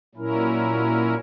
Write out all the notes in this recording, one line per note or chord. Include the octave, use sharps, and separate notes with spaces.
A#2 F#3 C#4 E4 A#4